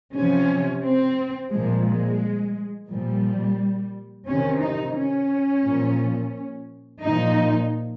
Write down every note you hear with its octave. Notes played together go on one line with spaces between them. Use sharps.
C3 F3 C#4
C4
A#2 F3 G#3
G#3
A#2 F3 G3
C3 D#3 C#4
D#4
C#4
A#2 F3
A#2 F3 D#4